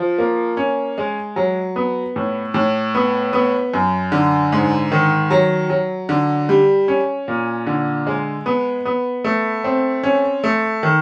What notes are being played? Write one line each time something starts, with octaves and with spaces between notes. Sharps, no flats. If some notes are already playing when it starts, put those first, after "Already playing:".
Already playing: F3
A#3
C#4
G#3
F#3
B3
A2
A2
B3
B3
F#2
D3
G#2
D#3
F#3
F#3
D3
G3
C#4
A#2
D3
G#3
B3
B3
A3
C4
C#4
A3
D#3